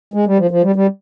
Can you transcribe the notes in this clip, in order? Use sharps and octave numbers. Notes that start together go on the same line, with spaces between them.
G#3
G3
F3
F3
G3
G3